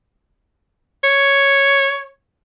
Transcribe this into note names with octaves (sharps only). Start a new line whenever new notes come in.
C#5